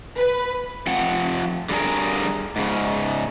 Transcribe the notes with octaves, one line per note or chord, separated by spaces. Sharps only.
B4
F3 C4 F#5
D3 G3 E4 F#4 G#4 A#4
G#2 C#3